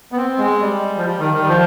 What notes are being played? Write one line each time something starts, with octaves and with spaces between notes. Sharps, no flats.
B3
C4
G#3
G3
F3
G3
D#3
D#3
G3
F3